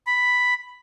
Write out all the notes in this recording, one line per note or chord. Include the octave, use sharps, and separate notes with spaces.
B5